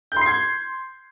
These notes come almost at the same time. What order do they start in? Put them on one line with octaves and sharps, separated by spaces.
G6 C6 C7 G#6